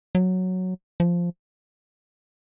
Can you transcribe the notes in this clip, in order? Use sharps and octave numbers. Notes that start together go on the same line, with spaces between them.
F#3
F3